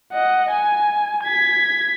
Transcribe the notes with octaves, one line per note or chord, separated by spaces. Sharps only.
D#5 F#5
G#5
G#6 B6